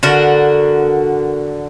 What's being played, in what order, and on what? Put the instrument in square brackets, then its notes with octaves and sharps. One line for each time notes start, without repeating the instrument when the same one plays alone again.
[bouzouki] D3 F#4 A#4